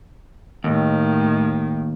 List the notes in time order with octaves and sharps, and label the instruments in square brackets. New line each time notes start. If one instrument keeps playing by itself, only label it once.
[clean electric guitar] D#2 [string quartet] A2 D#3